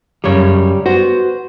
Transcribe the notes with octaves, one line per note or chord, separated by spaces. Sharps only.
F#2 C#3 G3 C#5
B3 F#4 C5